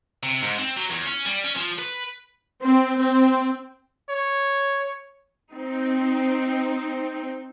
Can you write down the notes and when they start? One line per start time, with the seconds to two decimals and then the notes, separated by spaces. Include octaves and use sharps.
0.23 C3
0.43 G#2
0.59 C4
0.77 F#3
0.90 E2
1.05 C#4
1.25 G3
1.44 C#4
1.56 F3
1.78 B4
2.62 C4
2.98 C4
4.09 C#5
5.53 C4 D#4